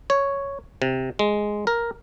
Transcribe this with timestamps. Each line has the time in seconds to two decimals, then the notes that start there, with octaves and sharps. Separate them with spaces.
0.10 C#5
0.82 C3
1.19 G#3
1.67 A#4